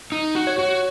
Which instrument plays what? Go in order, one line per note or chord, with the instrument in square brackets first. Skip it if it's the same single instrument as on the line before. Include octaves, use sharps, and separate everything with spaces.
[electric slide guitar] D#4
F#4
[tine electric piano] C#5
[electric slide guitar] F#4